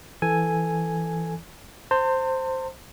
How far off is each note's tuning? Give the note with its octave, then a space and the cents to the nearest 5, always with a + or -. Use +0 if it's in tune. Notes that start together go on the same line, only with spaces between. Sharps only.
E3 +10 A4 +0 G#5 +0
C5 +0 A5 +45